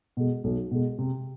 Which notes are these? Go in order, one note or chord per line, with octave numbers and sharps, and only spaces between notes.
B2 G#3
B1
B2 G#3
C3